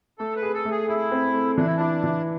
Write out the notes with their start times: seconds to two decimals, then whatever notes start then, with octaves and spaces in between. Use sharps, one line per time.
0.18 A3 A4
0.36 B4
0.42 G#4
0.54 A4
0.65 A3
0.71 G#4
0.88 E4 G#4
1.11 C4
1.34 A3
1.57 E3 D4
1.66 E4
1.77 D4 E4
2.04 E3